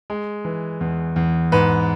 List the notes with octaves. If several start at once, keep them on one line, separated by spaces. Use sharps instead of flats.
G#3
E3
E2
E2
G#2 B4